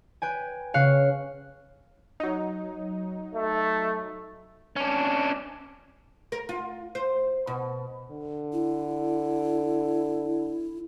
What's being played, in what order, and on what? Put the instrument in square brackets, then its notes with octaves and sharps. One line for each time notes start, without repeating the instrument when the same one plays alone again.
[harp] B4 G5 G#5
C#3 F5 F#6 C#7
[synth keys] F#3 D#4
[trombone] A3
[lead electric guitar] C#4 D4
[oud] A#4
F4
C5
B2
[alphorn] D3
[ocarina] E4